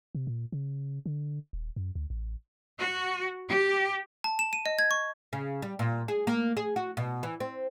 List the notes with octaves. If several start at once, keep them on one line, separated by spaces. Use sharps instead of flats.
C3
A#2
C#3
D3
D#1
F#2
D2
A1
F#4
G4
A5
E7
D#7
D#5
G#6
C#6
C#3
G3
A#2
G#4
A#3
G#4
F#4
B2
E3
C4